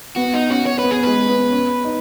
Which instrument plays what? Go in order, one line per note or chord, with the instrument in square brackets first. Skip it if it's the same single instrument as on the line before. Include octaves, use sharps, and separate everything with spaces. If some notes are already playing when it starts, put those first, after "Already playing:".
[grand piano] B3 [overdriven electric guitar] F#4
[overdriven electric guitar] D#4
[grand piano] C#4 [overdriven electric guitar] F#4
[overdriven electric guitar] C#5
[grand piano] B3 [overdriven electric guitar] B4
[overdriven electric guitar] G#4
[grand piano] G#3 [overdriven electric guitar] B4
[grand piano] B3
C#4
D#4